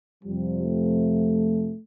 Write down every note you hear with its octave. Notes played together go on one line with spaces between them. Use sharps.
F2 C3 F3 G3
A3